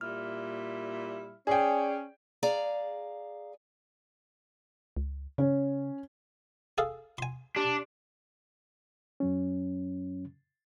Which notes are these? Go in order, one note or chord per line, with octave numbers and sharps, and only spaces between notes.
A#2 G3 E4 F6
C#4 G#4 D5 G5
G#4 D5 F5 A#5
C#2
C#3 C#4
G#4 A4 F5
G#5 C6
D4 G4
F#2 F#3 C#4